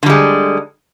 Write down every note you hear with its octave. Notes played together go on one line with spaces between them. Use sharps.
D3 G3 G#3